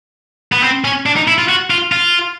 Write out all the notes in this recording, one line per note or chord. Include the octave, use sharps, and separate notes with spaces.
B3
C4
C#4
D4
D#4
E4
F4
F#4
F4
F4